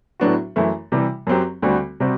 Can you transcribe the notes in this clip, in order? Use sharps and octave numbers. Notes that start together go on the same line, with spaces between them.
A2 F#3 B3 D4 F#4
F#2 E3 A3 E4
C3 E3 G3
F#2 F#3 C4 G4
D2 D3 G3 C4 F#4
C3 G3 C4 F#4